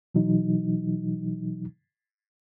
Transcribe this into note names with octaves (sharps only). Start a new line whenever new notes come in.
B2 E3 F#3 D#4